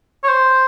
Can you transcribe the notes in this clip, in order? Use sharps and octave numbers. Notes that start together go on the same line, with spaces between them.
C#5
C5